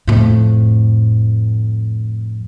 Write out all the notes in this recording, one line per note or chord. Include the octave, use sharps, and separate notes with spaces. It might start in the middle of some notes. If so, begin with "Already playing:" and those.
F2 A2